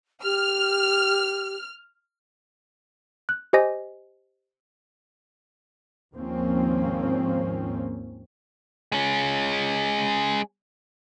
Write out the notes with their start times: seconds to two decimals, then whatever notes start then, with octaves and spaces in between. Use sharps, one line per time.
0.24 G4 F6
3.29 F#6
3.53 G4 C5 D#5 G#5 A#6
6.14 D#2 G#2 F3 A#3 C4 C#4
8.92 G#3 C#4